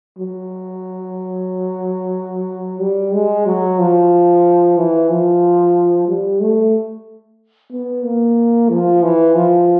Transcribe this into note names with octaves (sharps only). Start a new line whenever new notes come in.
F#3
G3
G#3
F#3
F3
E3
F3
G3
A3
B3
A#3
F3
E3
F3